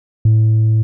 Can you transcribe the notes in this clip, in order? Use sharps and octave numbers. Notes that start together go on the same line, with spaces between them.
A2